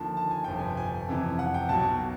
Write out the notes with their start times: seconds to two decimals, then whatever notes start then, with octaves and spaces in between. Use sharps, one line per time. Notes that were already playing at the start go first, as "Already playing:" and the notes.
Already playing: D#2 D3 F3 A5
0.17 A5
0.31 G#5
0.44 G1 F2 C3 F3 G5
0.59 G#5
0.77 G#5
1.08 F2 C3 E3
1.39 F#5
1.54 G5
1.69 B1 B2 F#3 A5